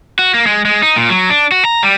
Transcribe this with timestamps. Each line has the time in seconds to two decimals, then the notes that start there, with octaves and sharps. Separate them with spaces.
0.19 F#4
0.34 A#3
0.46 G#3
0.65 G#3
0.83 D#4
0.96 A#2
1.10 F#3
1.30 D4
1.52 F#4
1.65 A#5
1.83 G3